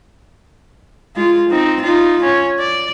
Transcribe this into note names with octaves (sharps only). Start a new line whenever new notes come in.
G#3 F4
C4 D#4
D#4 F4
C#4
D5